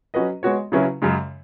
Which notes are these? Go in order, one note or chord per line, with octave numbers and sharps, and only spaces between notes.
F#3 C#4 F#4 B4 D#5
G#3 B3 F#4 C#5
C#3 F#3 C#4 E4 B4
F#2 C#3 G#3